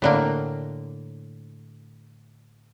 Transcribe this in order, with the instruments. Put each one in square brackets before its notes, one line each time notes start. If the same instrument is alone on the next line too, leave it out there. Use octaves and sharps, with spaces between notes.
[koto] A2 D3 A#3